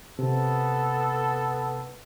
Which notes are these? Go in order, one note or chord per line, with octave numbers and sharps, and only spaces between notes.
C3 B3 A4